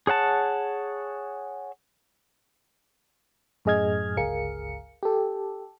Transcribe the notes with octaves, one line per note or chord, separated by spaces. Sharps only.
G#4 C#5 F#5 A5
F#2 A2 G#4 D#5 F6 G#6
G1 C#2 G#4 A#4 F5 C#7
G4 A4